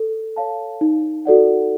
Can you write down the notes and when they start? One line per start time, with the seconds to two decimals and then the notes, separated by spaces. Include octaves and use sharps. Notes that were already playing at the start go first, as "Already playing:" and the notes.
Already playing: A4
0.36 C#5 F5 A5
0.81 D#4
1.25 F#4 A4 D5 F#5